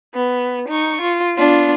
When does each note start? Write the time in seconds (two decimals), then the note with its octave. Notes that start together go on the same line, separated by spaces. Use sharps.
0.14 B3
0.68 D#4 C#6
1.01 F4
1.35 B3 D4 F4